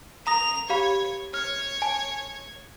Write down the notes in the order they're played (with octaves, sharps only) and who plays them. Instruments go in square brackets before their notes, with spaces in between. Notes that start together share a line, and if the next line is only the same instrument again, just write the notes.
[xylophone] A#5 D#6 A#6 [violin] F7
[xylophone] G4 F5 B5 [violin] C#5
[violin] C#5 [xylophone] F6
[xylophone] G#5 A5